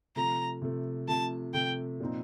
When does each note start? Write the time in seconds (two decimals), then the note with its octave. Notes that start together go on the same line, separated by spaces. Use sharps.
0.16 C3 F3 A3 A#5
0.62 C3 F3 A3
1.08 C3 F3 A3 A5
1.54 C3 F3 A3 G5
2.00 A#2 F3 C4 D#4